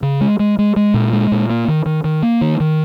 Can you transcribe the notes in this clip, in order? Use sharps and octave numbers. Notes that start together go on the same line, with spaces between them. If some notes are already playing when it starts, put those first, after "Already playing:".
C#3
G#3
G#3
G#3
G#3
A#2
G#3
A#2
A#3
D#3
D#3
D#3
A#3
D#3
D#3